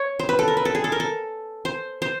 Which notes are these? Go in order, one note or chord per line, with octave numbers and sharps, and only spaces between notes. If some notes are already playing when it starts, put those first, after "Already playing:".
Already playing: C#5
C5
B4
A4
A#4
B4
A4
G#4
A4
A#4
A4
C5
C5